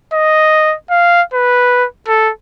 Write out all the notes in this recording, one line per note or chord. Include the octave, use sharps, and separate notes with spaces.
D#5
F5
B4
A4